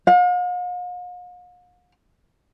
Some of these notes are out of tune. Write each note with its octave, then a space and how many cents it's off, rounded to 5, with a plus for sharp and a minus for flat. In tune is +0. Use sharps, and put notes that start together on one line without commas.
F5 +45